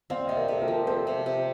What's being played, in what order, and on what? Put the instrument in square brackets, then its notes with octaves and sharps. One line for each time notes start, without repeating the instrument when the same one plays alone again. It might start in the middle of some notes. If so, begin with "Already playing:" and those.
[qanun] C4 [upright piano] D5 F5
[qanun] C3 [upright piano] D#5
[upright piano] A#4 D5
[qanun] C3 [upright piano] A4
[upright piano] G4 A#4
[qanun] F3
[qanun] C4 [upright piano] A4 C5
[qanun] C3
C3